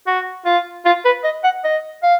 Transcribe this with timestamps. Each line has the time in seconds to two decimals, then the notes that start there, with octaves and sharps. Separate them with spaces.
0.07 F#4
0.45 F4
0.85 F4
1.05 B4
1.24 D#5
1.44 F#5
1.64 D#5
2.03 F5